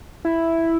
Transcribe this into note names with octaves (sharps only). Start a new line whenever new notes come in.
E4